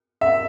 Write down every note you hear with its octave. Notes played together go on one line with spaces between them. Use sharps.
E5